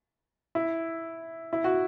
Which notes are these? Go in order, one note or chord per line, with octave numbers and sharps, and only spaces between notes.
E4
E4
F#4